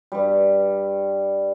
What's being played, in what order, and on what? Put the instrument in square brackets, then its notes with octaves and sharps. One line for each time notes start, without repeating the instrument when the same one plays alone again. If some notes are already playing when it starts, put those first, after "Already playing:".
[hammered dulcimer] G2 G3